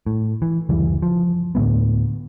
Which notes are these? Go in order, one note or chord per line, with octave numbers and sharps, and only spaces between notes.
A2
E3
F#1 D2 E3 G3
F3
D2 A2 G#3 B3